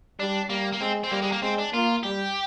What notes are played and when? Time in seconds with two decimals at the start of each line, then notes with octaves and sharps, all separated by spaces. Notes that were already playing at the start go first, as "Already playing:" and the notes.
0.19 G3 D4
0.49 G3 A#3
0.72 A#3
0.80 G#3 C4
1.04 C4
1.11 G3 A#3
1.22 G#3
1.32 A#3
1.42 G#3 C4
1.58 D4
1.73 A#3 F4
2.03 G3 G4